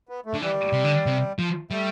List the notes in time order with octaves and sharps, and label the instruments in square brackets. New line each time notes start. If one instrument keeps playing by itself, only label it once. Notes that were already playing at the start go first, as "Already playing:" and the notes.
[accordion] B3
A3
[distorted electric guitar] D3
[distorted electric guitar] E3 [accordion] G3
[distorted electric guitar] C3
D3
C3
F3
[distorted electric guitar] G3 [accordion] A3